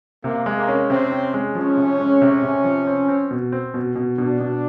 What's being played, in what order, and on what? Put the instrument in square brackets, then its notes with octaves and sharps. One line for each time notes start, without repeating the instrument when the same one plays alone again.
[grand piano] C3 [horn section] A#3
[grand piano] G#3
[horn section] A#3
[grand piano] C#4
[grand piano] C3 [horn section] C4
[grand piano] C#4
G#3
[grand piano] F3 [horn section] C#4
[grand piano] C3
G#3
C3
C3
F3
C4
C4
B2
C4
B2
B2
[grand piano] B2 [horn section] D4
[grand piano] B2